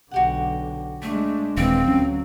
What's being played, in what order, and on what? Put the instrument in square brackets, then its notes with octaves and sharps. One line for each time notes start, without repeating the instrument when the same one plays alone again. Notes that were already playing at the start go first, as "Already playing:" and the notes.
[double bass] B1 D3 [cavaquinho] F#4 G4 F#5
[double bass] G#3 D4 [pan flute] A3
[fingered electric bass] D#1 [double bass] E3 G#3 [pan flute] C4 [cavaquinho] F5
[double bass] D2 F#3 [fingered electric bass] C#4